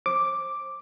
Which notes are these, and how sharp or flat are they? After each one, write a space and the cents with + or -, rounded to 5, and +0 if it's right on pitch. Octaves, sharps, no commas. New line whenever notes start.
C5 +35 D6 +0